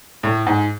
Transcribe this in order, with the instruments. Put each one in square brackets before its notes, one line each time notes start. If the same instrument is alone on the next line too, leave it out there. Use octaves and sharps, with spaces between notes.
[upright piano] A2
G#2